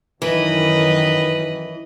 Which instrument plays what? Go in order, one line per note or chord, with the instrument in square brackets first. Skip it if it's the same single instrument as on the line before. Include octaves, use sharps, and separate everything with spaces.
[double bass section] F#2 D#3 [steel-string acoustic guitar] E3 [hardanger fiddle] B4 D#5